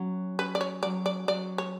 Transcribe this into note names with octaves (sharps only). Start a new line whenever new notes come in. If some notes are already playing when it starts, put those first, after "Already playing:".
Already playing: F#3 C#4
C#4 B4
D5
C#5
F#3 D5
D5
F#3 D5
C#5